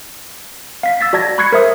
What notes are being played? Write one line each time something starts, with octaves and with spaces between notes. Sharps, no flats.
F5 B6
E6 A6 B6
F#4 D5 A5 G#6 A#6
B5 C#6 F#6 G#6 C7 C#7
A#4 C5 E5 D#6